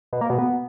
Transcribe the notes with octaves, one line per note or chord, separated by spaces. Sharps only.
B2
A#3
B2
B3